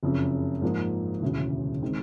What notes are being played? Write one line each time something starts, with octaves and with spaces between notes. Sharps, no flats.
F#1 F2 C#3
G#2 F3 A#3
E1 D2 C#3 E3
D#3 G#3 C4